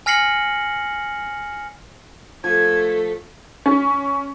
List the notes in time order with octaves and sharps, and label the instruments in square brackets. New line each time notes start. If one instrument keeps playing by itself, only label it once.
[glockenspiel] G#5 F6 A#6 C7 C#7 F#7
[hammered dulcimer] F3 [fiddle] A3 [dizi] G#6
[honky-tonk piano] C#4